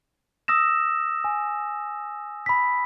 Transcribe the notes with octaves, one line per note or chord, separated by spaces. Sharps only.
D#6 E6 A#6 E7
G#5
B5 B6